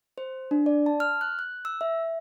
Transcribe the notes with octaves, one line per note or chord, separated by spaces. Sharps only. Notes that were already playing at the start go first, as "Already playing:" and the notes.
C5
D4
D5
A5
F6
F#6
F#6
E6
E5